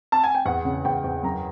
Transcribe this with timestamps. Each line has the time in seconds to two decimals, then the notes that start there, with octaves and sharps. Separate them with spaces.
0.12 A5
0.24 G#5
0.35 G5
0.46 E2 F#5
0.65 C#3
0.85 E2 G5
1.04 E2
1.23 F#2 A#5